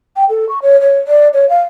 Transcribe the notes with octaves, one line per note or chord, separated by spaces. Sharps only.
G5
A4
C#6
C#5
C#5
D5
C#5
F5